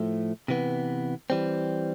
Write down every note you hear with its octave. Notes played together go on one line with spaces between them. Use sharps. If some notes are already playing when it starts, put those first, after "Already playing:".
Already playing: A2 F3 A3
C3 E3 B3
E3 G3 C4